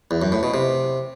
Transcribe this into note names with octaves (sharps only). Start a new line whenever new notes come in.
E2
F#2
A2
B2
C3